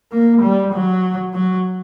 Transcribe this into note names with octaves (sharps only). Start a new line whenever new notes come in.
A#3
G3
F#3
F#3